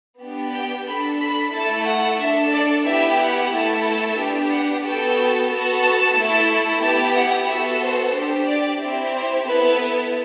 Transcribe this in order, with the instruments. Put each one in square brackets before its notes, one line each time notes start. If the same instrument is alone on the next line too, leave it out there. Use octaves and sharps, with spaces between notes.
[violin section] B3 D4 G4
G5
D4 A4 B5
B5
A3 E4 A4 A5
F#5
D4 A4 E5
D5
B3 E4 G4 E5
F#5
A3 E4 A4
B3 D4 G4
F#5
B3 F#4 A4 G5
B3 F#4 A4
A5
A3 E4 A4 A5
B3 E4 G4 A5
F#5
B3 F#4 A4 E5
C5
D4 G4 C5
D5
C4 E4 G4
C5
B3 E4 A4 B4